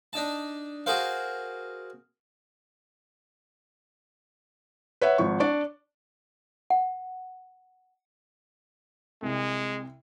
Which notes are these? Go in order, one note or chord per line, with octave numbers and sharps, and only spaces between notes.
D4 D#4 A5
F#4 G#4 A#4 C5 F5
B4 C#5 E5 F#5
G#1 F3 C#6
D4 D5 C#6
F#5
C2 C3 G#3